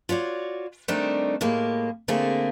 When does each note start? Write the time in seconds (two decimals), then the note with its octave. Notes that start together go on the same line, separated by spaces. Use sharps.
0.09 F4 F#4 C#5 D5
0.88 D#3 G3 A3 C4 D4 D#4
1.41 A2 G#3 A#3 G4
2.08 D3 A3 A#3 C4 G#4